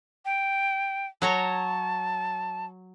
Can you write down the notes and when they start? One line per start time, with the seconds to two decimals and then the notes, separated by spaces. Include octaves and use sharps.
0.25 G5
1.22 F#3 C#5 A5 A#5